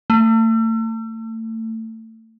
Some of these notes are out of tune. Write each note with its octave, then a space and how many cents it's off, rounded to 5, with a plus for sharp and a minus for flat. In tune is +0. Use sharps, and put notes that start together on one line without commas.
A3 +35